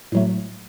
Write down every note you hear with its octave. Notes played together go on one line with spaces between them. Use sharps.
A2 F#3 A3